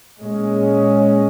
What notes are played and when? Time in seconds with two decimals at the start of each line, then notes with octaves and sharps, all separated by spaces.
0.20 A#2 G#3 C#4